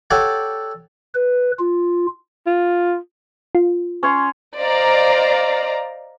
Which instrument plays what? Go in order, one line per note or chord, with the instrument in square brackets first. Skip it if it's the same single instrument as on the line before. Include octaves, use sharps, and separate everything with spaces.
[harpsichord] G4 A4 C#5 D5 F#5
[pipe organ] B4
F4
[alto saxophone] F4
[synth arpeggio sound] F4
[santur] C#4 C#5 C6
[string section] C5 D5 D#5 F5 A#5